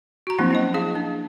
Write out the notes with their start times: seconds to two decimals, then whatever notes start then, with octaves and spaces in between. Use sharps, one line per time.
0.27 F#4 A#5
0.39 F3 F#3 A#3 C4 D4 E4
0.51 C#4 E4 D#5
0.74 C#4 G#4 F5
0.95 D4